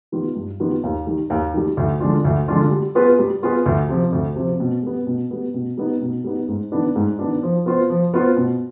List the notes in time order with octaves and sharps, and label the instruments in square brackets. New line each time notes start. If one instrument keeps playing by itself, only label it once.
[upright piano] D#3 G3 B3 F4
G2
D#3 G3 B3 F4
D#2
D#3 G3
D#2
D#3 G3
D2
D3 G#3 D4 F4
D2
D3 G#3 D4 F4
G3
B3 F4 G#4 B4
G3
B3 F4 G#4 B4
D2
C3 F3
D2
C3 F3
B2
G3 B3
B2
G3 B3
B2
G3 B3 D#4
B2
G3 B3 D#4
G#2
D#3 B3 D4
G#2
D#3 B3 D4
F3
B3 F4 C5
F3
B3 F4 C5
B2